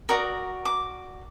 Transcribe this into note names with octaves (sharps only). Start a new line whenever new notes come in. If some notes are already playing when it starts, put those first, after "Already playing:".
F#4 A#4 D5 D#6
D6